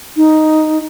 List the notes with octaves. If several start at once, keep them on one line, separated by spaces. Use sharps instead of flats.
D#4